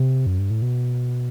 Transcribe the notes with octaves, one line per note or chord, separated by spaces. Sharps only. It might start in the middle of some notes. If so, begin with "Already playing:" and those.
Already playing: C3
F#2
G2
A2
B2